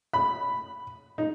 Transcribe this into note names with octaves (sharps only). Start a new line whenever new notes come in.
B5
D#4